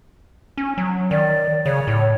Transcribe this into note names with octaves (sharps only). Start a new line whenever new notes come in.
C#4
F#3
D#3 D5
C#3 C#5
A2